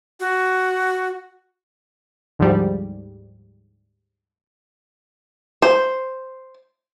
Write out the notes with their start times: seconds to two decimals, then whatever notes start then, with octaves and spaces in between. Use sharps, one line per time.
0.20 F#4
2.39 D2 G#2 F3 G3
5.62 C5